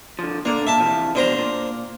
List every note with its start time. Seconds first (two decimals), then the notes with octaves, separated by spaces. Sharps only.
0.19 D3 F3
0.45 D3 A#3 D4
0.67 A#2 E5 A5
0.80 C3 E3 F3
1.15 F2 B2 D3 C5 A#5
1.38 A#2